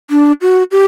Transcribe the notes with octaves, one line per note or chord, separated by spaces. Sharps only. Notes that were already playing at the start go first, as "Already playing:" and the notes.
D4
F#4
G4